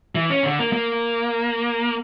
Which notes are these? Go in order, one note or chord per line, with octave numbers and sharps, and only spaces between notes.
E3
C#4
D3
A#3
A#3